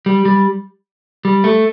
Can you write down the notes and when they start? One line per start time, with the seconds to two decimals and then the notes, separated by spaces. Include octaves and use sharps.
0.06 G3
0.25 G3
1.25 G3
1.44 A3